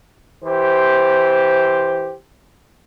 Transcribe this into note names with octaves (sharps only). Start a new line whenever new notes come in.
E3 G4 C5